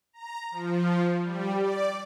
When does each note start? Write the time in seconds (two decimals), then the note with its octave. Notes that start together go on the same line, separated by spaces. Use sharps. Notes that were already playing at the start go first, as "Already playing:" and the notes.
0.13 A#5
0.51 F3
1.22 G3
1.56 D5